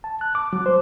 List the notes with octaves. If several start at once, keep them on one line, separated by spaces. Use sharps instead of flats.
A5
F#6
D6
F#3
C5